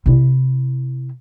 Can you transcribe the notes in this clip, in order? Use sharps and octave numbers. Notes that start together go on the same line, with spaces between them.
C3 E4